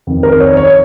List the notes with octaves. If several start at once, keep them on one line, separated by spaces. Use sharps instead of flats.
F2 D#3
A#4
C#5
C#5